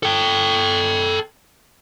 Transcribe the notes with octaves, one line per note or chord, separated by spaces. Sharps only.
A4 G5